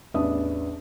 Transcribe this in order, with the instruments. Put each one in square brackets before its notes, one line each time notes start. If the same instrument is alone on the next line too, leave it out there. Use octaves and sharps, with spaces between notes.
[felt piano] A1 E2 D4 B4 E5 D#6